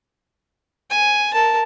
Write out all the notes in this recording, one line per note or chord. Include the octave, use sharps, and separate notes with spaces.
G#5
A#4 A5